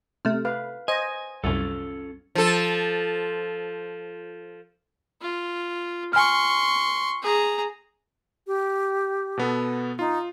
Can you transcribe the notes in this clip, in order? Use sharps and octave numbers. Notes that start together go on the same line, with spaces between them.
C3 A3 F6
B4 F5
C5 D#5 G#5
C2 F#2 C3 C#4 F4 A4
F3 A4
F4
G#5 C6 C#6 F6
G#4 A#5
G4
B2 B3 A4
D#4 F4